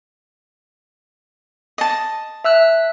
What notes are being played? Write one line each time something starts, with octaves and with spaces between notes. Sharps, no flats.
D#5 A5
E5 E6 F#6